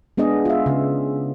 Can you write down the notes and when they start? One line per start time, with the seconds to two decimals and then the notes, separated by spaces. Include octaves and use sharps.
0.17 G#3 B3 D4 G#4 D#5
0.45 F4 E5
0.66 C#3